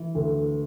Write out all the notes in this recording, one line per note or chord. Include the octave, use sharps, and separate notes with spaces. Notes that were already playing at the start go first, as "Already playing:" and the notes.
Already playing: E3
D2